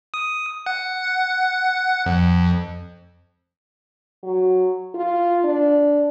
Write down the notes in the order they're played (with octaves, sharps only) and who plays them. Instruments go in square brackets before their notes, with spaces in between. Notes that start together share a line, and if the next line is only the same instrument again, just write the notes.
[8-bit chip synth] D#6
F#5
F2
[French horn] F#3
F4
D4